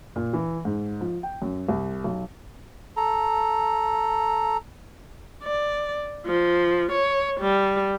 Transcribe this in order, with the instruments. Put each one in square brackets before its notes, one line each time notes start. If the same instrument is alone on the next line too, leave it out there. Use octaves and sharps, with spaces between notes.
[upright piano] A#2
E3
G#2
F3
G5
F#2
C2
B1
[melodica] A4 A#5
[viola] D5
F3
C#5
G3